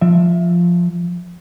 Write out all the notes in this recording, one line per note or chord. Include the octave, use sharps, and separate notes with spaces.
F3 E5